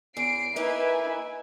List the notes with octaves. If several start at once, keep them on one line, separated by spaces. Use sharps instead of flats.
E2 C7 D7
A#3 D#4 E4 B4 G#5